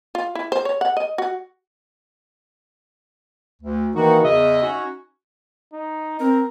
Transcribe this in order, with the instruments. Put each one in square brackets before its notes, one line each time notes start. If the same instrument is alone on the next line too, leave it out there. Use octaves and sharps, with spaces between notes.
[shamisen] F4
E4
C5
C#5
F#5
D#5
F#4
[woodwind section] D2
[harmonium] D#3 E3 D#4 [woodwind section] A#3 F#4
[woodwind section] E2 C#3 D#5 [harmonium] E5
[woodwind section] C#4 D#4 F#4
[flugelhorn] D#4
[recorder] C4 [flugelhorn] A#4